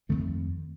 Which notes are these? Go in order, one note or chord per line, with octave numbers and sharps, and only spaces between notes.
F2 D#3 A3 C4